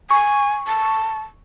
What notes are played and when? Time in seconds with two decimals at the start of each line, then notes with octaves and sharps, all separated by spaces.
0.11 G#5 C#6
0.68 A5